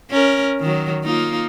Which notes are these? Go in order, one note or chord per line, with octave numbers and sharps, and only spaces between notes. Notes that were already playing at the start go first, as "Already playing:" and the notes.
C#4 A#4
D#3 F#3
A#3 D#4 F4